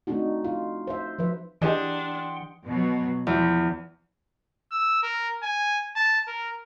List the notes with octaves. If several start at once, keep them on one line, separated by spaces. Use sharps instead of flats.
A3 C4 D4 D#4 F#4
F4
C5 E5
F3 B4 E5
E3 D4 G4 G#4 D#5 F#5 G5 C6
B2 F#3
E2 F3
E6
A#4
G#5
A5
A#4